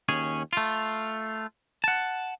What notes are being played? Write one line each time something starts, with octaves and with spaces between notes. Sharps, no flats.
D#2 C#4 G#4
A3 F4
F#5 A5